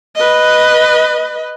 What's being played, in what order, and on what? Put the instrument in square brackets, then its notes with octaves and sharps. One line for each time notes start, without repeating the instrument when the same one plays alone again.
[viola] B4 D#5